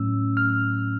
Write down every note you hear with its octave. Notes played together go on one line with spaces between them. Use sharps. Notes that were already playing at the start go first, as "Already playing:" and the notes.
Already playing: A2 F#3 A3 C#4 E6
F6